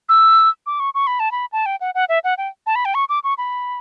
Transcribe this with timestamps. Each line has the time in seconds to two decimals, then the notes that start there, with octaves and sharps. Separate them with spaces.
0.09 E6
0.66 D6
0.80 C#6
0.95 C#6
1.07 B5
1.20 A5
1.32 B5
1.52 A5
1.66 G5
1.81 F#5
1.95 F#5
2.09 E5
2.24 F#5
2.38 G5
2.67 A5
2.75 B5
2.85 G5
2.95 C#6
3.09 D6
3.24 C#6
3.38 B5